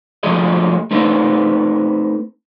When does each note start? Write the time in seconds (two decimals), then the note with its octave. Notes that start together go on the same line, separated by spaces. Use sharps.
0.23 F3 F#3 A3 F4 G#4 D#5
0.91 A3 C4 D#4 A4 B4 C5